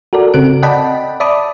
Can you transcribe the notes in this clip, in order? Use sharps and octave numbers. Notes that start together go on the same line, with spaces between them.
F#4 A4 A#4 D5
C#3 C4 F#6 D7
D5 D#5 F#5 G5 A5 B5
D5 E5 A5 B5 D6 D#6